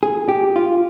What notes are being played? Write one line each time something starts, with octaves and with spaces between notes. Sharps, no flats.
G#4
G4
F4